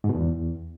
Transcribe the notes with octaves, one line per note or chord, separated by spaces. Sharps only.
G#2
B2
E2